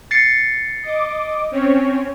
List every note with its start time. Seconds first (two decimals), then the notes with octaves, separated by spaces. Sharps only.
0.11 A6 C7 C#7
0.83 D#5 D6
1.51 C4 C#4 C#5